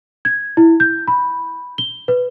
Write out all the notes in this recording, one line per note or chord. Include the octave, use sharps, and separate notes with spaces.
G#6
E4
G6
B5
G7
B4